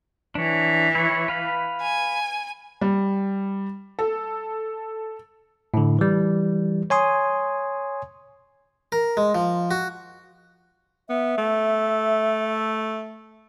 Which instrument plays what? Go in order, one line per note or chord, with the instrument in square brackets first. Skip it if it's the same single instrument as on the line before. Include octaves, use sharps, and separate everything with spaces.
[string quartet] E3 [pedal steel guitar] D4 C#5
[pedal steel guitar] E4 C#5
B4 F5 B5
[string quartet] G#5
[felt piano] G3
A4
[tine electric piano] A2 D3
E3 G3
C#5 G#5 C6 D#6
[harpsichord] A#4
G#3
F3
F#4
[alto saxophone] B3 [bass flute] E5
[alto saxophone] A3